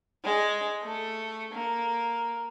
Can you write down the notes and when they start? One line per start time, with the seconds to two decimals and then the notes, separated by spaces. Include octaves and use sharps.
0.24 G#3
0.82 A3
1.53 A#3